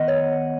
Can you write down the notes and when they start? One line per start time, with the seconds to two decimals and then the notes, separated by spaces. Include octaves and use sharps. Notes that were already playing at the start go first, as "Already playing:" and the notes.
Already playing: D#3 B3 D#5 F#5
0.08 C#5